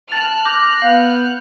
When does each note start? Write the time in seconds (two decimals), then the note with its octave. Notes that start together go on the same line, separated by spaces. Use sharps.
0.12 A5 F6 F#6 A6
0.45 D6 G6 A#6
0.82 B3 F5 G6